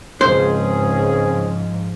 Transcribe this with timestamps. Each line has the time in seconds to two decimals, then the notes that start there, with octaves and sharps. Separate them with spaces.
0.21 C#2 G#2 F3 C4 C#4 G#4 C5